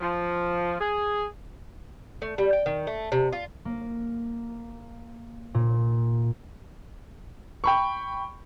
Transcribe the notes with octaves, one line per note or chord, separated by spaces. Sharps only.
F3
G#4
A3
G3
G5
D#3
A3
C3
F4
A#3
A#2
G5 B5 C#6